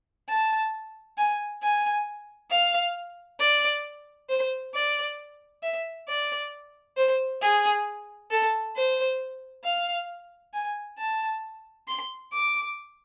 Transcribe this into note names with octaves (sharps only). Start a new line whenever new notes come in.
A5
G#5
G#5
F5
D5
C5
D5
E5
D5
C5
G#4
A4
C5
F5
G#5
A5
C6
D6